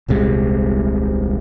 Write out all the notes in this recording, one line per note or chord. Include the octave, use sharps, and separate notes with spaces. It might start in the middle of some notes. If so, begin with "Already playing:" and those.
D#1 C2 C3 G#3